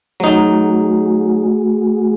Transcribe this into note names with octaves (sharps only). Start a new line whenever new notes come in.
F#3 A3 D#4 F#4 G#4